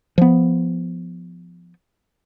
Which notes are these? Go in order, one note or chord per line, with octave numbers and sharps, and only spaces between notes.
F3 B3